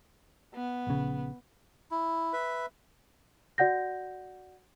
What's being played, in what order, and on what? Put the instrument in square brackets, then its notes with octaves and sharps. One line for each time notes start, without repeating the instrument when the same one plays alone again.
[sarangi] B3
[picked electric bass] A#1 C#3
[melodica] E4
B4 E5
[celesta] F#4 D5 F#5 G6 A#6